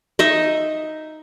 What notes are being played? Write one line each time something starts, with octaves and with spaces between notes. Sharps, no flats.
D#4 D#5 E5